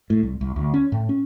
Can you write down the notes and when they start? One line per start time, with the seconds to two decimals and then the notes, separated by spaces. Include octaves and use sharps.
0.10 A2
0.23 C2
0.41 C2
0.56 D2
0.74 C#4
0.92 A2
1.09 C#4